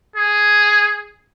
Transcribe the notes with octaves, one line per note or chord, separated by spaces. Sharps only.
G#4